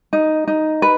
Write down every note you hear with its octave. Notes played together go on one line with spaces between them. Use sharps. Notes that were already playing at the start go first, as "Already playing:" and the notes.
D#4
D#4
B4